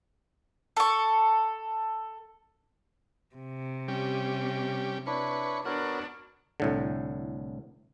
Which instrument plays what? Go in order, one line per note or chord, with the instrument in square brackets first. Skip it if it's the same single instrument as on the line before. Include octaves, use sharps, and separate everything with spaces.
[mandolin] A4 C#6
[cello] C3
[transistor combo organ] G3 C#4 G4
[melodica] D4 E4 C#5 [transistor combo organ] B4 C#6
[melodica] B3 A#4 C#5 [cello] D4 [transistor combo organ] F#4
[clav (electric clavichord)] C2 A2 D3